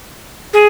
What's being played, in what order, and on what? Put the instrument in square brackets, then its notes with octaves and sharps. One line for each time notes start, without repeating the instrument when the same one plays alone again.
[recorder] G#4